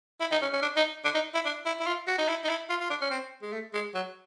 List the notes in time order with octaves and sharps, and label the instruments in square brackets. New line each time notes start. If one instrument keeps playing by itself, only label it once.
[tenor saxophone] E4
D#4
C#4
C#4
D4
D#4
D4
D#4
E4
D4
E4
E4
F4
F#4
D#4
E4
D#4
E4
F4
F4
D4
C#4
C4
G#3
A3
G#3
F#3